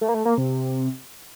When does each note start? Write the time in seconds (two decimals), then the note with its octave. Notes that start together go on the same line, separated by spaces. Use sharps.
0.01 A3
0.09 A#3
0.14 A3
0.25 A#3
0.38 C3